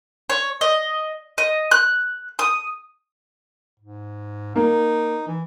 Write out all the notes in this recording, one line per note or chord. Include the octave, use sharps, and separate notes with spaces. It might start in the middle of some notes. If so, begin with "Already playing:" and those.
C#5
D#5
D#5
F#6
D#6
G#2
A#3 D#4
E3